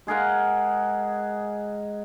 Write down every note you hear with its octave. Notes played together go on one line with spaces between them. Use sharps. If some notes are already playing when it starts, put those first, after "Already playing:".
G#3 G#4 A#4 F#5